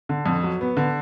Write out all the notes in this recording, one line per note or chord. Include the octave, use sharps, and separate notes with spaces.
D3
F2
F#3
B3
D3